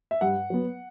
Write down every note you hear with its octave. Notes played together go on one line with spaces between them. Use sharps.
E5
G2 F#5
F#3 B3